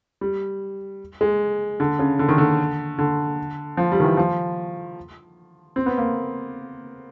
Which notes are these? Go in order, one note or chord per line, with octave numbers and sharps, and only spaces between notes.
G3
G#3
D3
C#3
D3
D#3
D3
D3
F3
G3
D#3
E3
F3
C4
B3
A#3